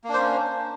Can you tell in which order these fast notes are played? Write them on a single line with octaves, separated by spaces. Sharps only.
A#3 D4 C5 C#4